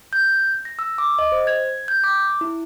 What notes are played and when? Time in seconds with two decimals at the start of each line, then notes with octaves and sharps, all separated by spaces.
0.13 G6
0.65 A#6
0.79 E6
0.98 D6
1.19 D#5
1.32 C5
1.47 G#6
1.88 G6
2.04 D6
2.41 E4